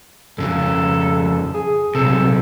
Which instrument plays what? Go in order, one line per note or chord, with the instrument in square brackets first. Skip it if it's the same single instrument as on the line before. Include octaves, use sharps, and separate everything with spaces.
[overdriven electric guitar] F2 C#3 [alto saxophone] A4
[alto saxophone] G#4
[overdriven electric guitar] B1 C3 [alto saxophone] A4